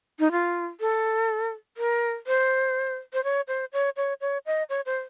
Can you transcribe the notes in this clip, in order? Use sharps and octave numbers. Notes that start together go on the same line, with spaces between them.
D#4
F4
A4
A#4
C5
C5
C#5
C5
C#5
C#5
C#5
D#5
C#5
C5